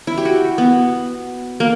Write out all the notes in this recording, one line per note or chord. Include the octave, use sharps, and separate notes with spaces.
E4
G4
F#4
B3
A#3